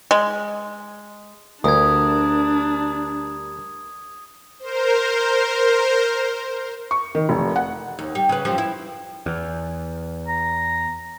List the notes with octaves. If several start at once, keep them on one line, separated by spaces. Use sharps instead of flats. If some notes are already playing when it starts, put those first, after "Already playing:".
G#3
D2 G3 D4 A#4 D#6 G#6
A#4 C5
C#6
D#3
F1
F#5
D#2
G3
C#3 B4
F#2 F3 G3
E4
E2
A#5